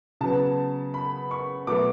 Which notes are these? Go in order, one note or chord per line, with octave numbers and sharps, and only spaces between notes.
C#3 F#3 B3 A5
B5
C#6
B2 F#3 A3 D6